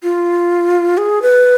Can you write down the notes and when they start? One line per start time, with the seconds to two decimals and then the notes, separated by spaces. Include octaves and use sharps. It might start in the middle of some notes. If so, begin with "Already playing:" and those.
0.03 F4
0.98 G#4
1.22 B4